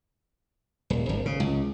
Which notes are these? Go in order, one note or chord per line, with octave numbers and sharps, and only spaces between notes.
D#1
G#1
C#3
C#2